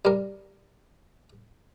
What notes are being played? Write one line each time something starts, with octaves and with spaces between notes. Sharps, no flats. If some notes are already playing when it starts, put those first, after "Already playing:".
G3 A#4